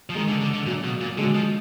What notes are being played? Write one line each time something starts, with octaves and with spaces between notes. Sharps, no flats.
F3
D#3 G#3
D3
D3
D3
A#2 F#3
B2
A#2
F#3
D3 G#3
F3